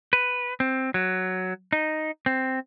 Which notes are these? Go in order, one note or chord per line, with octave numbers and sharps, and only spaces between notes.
B4
C4
F#3
D#4
C4